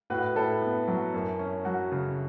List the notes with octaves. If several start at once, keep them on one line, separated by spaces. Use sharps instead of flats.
A2 F#4 B4
A2 E4 A4
B3
F#3
F#2
C#4
F#3 F#4
C#3